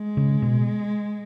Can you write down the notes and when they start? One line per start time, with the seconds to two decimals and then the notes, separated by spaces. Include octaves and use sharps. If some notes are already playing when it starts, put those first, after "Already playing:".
Already playing: G#3
0.17 C#3
0.42 B2